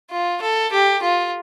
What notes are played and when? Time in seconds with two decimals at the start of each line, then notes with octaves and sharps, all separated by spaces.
0.11 F4
0.42 A4
0.72 G4
1.02 F4